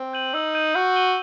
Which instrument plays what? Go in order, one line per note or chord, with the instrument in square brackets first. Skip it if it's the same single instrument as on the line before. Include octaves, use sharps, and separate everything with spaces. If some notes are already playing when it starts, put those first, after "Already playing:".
Already playing: [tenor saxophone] C4
[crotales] G6 D#7 F#7
[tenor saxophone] D#4 [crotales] E6
[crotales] G6 D#7 F#7
[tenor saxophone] F#4 [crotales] G6
[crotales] D#7 G7